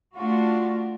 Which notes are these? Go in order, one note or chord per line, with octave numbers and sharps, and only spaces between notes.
A3 D4 F4 F#4